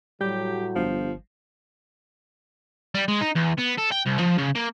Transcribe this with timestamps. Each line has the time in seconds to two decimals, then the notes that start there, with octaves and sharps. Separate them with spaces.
0.21 A2 F#3 G3 G4 G6
0.75 G1 F3
2.95 G3
3.08 G#3
3.21 D#4
3.35 E2
3.58 B3
3.78 A4
3.91 G5
4.06 C2
4.19 F3
4.38 C#3
4.55 A#3